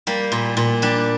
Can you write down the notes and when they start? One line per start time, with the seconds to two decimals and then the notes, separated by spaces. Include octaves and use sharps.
0.07 G3 A#3
0.32 A#2
0.57 A#2
0.82 G3 D4